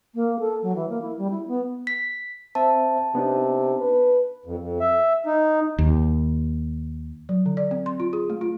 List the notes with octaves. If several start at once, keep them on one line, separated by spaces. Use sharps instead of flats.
A#3
A4
F#3
E3
A#3
E4
G3
E4
B3
B6
C4 C5 E5 A5
C3 B3 D4 D#4
B4
F2
F2
E5
D#4
D#2
F#3
D3
D5
C4
C6
F4
G#4
A3
F4